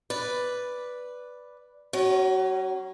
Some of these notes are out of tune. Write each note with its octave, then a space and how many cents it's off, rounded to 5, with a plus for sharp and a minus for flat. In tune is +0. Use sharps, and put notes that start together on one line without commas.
B4 +0 D5 +0
F#3 +30 C#4 -15